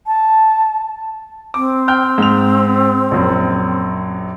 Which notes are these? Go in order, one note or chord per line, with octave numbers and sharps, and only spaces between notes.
A5
C4 D6
G5 F6 G6
G#2 F7
A#1 F#2